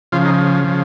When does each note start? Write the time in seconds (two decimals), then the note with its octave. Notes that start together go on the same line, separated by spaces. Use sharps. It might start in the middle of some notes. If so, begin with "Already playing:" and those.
0.12 C#3 F3 F4
0.25 D#4
0.64 C#3 F3